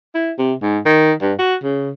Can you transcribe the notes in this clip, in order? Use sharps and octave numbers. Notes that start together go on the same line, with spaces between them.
E4
C3
G#2
D#3
G2
F#4
C#3